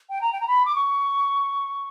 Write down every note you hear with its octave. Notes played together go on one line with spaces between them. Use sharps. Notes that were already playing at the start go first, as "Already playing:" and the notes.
G5
A#5
G5
A#5
B5
D6
C#6